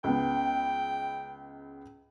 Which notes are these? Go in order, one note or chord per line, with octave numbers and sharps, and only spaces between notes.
C#2 B3 G5